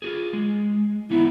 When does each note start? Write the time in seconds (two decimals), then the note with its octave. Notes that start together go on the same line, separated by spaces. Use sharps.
0.02 F4 F#4 G#4
0.33 G#3
1.10 E3 B3 D#4 E4